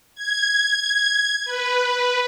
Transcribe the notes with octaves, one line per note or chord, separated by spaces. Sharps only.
G#6
B4